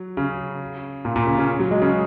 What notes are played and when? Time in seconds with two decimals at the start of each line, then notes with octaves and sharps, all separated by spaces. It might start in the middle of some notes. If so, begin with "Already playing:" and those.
Already playing: F#3
0.17 C#3
1.05 A#2
1.16 A#2
1.27 C#3
1.38 C#3
1.60 F#3
1.71 G#3
1.82 C#3